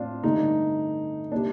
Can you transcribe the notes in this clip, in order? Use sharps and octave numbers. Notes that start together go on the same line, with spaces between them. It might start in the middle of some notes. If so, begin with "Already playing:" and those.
Already playing: A2 C4 D4 F4
G2 D3 A3 D#4
C3 G3 A#3 D4